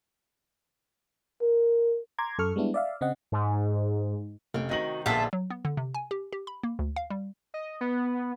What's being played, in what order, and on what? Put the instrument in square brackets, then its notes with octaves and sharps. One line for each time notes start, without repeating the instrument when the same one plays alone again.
[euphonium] A#4
[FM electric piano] A#5 C6 D6 G#6
F#2 A4 C#6 F6
G3 G#3 B3 D4 E4
D5 E5 F5
C#3 C4 D#5 F#5
[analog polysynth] G#2
[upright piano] F1 [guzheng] C#3 G5
[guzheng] C3 D#3 [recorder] F#4 [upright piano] D#5 A#6 F#7
[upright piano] A#1 [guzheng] D3 B3 D4 [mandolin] F4 E5 [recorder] A5
[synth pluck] F#3
B3
D3
C3
G#5
G4
G4
B5
A#3
D2
F5
G3
[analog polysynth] D#5
B3